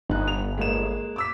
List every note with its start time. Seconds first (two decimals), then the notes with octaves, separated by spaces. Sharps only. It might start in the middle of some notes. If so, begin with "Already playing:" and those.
0.09 G1 D#4 F#6
0.28 F7
0.58 G#3 A#3 E7
1.16 D6 E6 B6